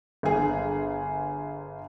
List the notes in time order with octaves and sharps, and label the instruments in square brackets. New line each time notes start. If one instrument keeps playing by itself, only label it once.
[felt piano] G1 G#4